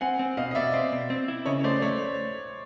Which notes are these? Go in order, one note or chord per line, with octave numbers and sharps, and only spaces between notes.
C4 F#5 G#5
C4
B2 D#5 F5
D#5
B2 D5 E5
C4
B2
C4
E4
C#3 C#5 D#5
A3 C5 D5
A3 C#5